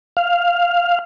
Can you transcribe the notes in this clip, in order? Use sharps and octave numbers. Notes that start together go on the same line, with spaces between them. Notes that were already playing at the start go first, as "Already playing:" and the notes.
F5